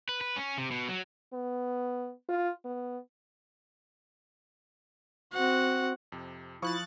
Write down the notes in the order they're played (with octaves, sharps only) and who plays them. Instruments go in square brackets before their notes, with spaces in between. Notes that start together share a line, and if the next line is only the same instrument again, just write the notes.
[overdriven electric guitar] B4
B4
C#4
C3
B2
F#3
[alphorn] B3
F4
B3
[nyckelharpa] C4 F#4 [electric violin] F#5
[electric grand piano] F2 C3
[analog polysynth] F3 F#6 A6 [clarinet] E4 [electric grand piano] F5 C#6 D#6